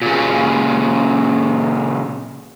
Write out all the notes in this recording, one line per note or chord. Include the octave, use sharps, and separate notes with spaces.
A#2 C#3